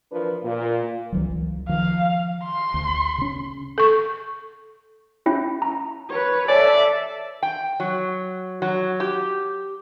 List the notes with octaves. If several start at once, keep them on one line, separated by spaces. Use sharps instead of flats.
E3 F3 D4 A#4 B4
A#2
C#2 E3 F#3
D#3 F3 F5
C6
D2
C#3 C#4
A4 C#6
C#4 E4 G5
A#5
B4 C#5
A4 C#5 D5 E5 G#5
G5
F#3
F#3
G4